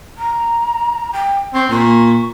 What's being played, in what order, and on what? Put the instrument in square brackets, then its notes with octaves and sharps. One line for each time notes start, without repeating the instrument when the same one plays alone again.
[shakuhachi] A#5
G5
[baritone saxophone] C4 [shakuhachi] C#6
[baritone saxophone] A#2 [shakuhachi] C#6